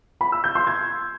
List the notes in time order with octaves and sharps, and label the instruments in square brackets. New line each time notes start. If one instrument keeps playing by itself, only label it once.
[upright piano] B5
E6
G6
C6
G#6